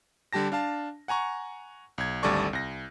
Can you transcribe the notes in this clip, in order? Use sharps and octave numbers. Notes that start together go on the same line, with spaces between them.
D3 G3 G4 A5 A#6
D4 F5 A5
F#5 G#5 A#5 C#6
B1 G#6
G#1 D2 G3 A4 D5 C#6
C2 A#6